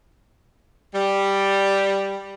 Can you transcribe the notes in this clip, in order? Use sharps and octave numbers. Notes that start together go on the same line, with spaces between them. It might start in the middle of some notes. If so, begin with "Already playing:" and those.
G3